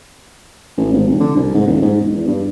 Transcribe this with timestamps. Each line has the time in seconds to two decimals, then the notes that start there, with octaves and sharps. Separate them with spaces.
0.78 A1
0.93 G#1
1.07 F1
1.20 D3
1.36 C2
1.54 G#2
1.67 D#1
1.82 G#2
2.01 E1
2.16 E2
2.27 G2